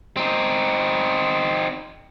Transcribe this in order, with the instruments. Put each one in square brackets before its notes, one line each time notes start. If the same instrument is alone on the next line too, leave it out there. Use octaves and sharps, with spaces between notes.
[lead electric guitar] C4 D#4